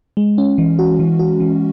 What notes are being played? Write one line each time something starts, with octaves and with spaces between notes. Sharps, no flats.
G#3
C#4
E3
F#4
E3
F#4
E3